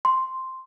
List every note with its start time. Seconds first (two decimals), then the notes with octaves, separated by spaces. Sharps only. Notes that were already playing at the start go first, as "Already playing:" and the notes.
0.05 C6